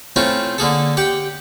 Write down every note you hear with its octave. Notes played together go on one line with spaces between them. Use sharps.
A3 C4 C#4 E4 F4
D3 A#3 G#4 A4
G4 F#5 G5